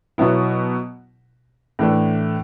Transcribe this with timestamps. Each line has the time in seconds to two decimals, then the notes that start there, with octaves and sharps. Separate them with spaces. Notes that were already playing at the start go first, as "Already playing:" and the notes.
0.18 B2 F#3 B3 E4
1.79 A2 E3 A3 D4